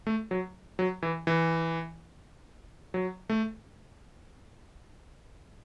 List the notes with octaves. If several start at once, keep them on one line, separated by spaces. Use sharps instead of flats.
A3
F#3
F#3
E3
E3
F#3
A3